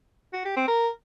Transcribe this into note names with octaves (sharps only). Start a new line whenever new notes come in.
F#4
G4
C4
A#4